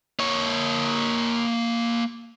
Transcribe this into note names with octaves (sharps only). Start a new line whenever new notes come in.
A#3 C#5